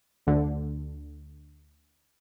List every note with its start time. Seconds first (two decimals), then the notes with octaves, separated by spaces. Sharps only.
0.27 D2 D3